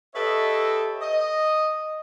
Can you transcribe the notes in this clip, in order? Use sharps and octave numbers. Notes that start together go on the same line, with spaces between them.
G4 A4 B4 C#5 D#5 E5
D#5